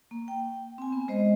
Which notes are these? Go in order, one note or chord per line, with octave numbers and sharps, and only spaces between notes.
A#3
G5
C4 G#5
B3
G#3 C5 D#5